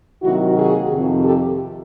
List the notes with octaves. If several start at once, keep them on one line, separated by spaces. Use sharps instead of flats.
C3 D#3 F#3 A#3 E4 F#4
F#4 G#4
F2 C3 D#3
G4 A4